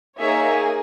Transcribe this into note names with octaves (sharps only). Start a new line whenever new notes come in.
A#3 D#4 G#4 C#5 E5